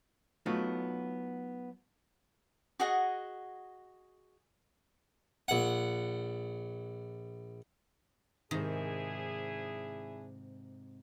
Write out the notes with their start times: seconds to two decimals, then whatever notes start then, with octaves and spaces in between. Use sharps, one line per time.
0.46 F#3 A3 B3 D#4 F4
2.80 F#4 G#4 D#5 F#5
5.48 A#1 F#5
8.51 G#2 C3 D#3 D4 E4 G#4